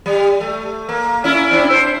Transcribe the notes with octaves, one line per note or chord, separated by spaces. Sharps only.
G3
A3
A#3
C#4 E4
C4 D4 E4
C5